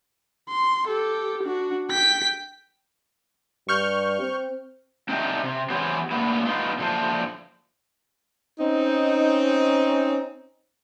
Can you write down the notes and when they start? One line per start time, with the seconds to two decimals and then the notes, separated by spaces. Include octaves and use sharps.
0.49 C6
0.88 G4 A4
1.43 D4 F#4
1.91 G5 B6
3.69 G2 C#6 F6 G6
4.20 C4
5.09 C4 D4 D#4 G4 D#5 E5
5.43 C3
5.70 E3 B3 G4 G#4 C5 C#5
6.11 A2 D3 A#3 B3 E4
6.46 B3 D#4 F4
6.79 A#2 D3 F3 E4 C5 A5
8.59 C4 C#4 D#4